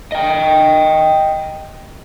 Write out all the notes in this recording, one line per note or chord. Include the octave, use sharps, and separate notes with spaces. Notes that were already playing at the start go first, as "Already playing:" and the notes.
D#5 G5